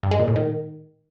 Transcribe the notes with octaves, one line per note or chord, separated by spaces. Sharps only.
G2
G#3
A#2
A2
D#3